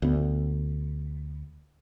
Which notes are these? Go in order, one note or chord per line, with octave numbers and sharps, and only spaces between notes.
D2 B3